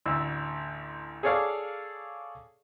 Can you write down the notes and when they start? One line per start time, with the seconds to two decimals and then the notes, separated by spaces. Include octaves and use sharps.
0.06 A1 D2 E6
1.23 G#4 A4 C#5 D5 F5